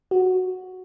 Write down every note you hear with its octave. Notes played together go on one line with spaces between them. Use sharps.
F#4